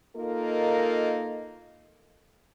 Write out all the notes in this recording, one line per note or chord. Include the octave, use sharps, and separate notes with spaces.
A#3 D#4 F4 A4 A#4 D#5